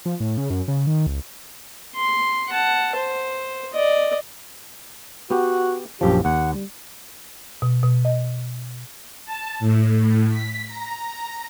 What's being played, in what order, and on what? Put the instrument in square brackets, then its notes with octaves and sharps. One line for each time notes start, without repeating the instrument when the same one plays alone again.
[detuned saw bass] F3
A2
C#3
F#2
C#3
D#3
C#2
[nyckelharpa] C6
F#5 A5
C5
D5 D#5
[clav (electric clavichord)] B3 G4 [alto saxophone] F#4
[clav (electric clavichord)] A#1 F#2 F3 [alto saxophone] G4
[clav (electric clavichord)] D#2 [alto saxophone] F#5
[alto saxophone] G3
[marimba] B2
B2
D#5
[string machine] A5
A2
B6
A#5